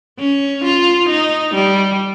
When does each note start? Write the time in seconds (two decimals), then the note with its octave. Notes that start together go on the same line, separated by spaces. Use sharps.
0.19 C#4
0.65 F4
1.09 D#4
1.54 G3